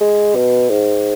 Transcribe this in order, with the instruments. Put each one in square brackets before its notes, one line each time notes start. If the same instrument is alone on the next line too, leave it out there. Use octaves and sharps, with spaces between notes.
[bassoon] G#3
B2
G#2